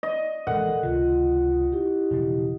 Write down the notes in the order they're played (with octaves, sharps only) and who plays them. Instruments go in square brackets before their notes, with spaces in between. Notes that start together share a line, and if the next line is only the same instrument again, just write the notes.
[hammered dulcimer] D#5
[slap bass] D#1 A1 G#3 [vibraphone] A4 A#4 [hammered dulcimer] F#5
[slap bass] C#2 C3 D#3 [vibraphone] F4
[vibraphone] E4 G4
[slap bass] E1 C#3 F3